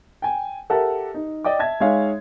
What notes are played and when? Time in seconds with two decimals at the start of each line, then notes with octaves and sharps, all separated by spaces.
0.22 G5 G#5
0.70 G4 A4 A#4 E5 F#5 A5
1.14 D#4
1.44 D5 D#5 G5 D6
1.59 E5 A5 G#6
1.80 G#3 D#4 G#4 C#5 E5 F5